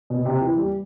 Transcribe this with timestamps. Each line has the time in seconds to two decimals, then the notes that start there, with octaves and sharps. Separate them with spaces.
0.10 B2
0.25 C3
0.41 E3
0.56 G3